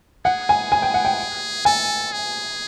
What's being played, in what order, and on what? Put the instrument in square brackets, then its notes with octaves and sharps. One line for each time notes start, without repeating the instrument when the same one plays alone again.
[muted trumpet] G#4 [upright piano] F#5
[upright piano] G#5
G#5
G5
F#5
G5
[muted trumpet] A4 [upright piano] G#5
[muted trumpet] G#4